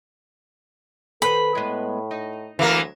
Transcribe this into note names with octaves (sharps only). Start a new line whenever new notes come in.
D#3 A4 B4 C5 B5
A2 G#3 B3
D#4
D2 E3 F#3 A#3 A#4